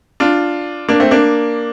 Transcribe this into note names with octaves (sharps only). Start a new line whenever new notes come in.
D4 F4
A#3 D4
A3 C4
A#3 D4